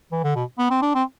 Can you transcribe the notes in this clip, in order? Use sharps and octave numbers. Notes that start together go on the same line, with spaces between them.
E3
D3
B2
B3
C4
D4
C4